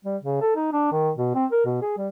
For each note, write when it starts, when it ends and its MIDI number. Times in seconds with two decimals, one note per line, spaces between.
0.04 0.17 55
0.22 0.40 49
0.41 0.53 69
0.56 0.71 63
0.72 0.89 62
0.92 1.10 51
1.16 1.33 47
1.35 1.46 60
1.52 1.61 70
1.65 1.81 47
1.82 1.97 68
1.97 2.08 55